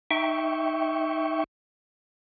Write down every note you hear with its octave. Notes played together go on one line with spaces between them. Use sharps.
D#4 E5 G5 C#6